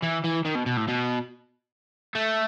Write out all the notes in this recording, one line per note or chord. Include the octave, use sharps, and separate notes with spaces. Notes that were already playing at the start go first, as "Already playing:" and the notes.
E3
E3
D#3
B2
B2
A2
B2
A3